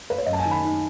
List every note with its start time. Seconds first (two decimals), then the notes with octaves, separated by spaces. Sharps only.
0.10 B4
0.18 C#5
0.26 F#2 D#5
0.33 A5
0.39 G#5
0.45 D#3
0.51 B5
0.64 D#4